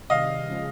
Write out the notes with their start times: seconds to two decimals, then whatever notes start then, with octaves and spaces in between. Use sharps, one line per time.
0.10 C3 D#3 G3 D#5 F5
0.49 C#3 F3 G#3